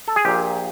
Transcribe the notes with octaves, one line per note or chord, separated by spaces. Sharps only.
A4
G#4
A#1 A#2 G4